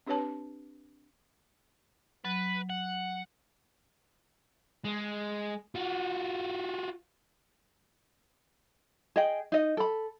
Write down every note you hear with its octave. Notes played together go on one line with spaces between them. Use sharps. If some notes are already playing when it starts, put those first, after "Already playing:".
C4 D4 G4 B4 C#5 A5
F#3 B4
F#5
G#3
F4 F#4
G#4 D#5 G5
D#4 D#5
A4 B5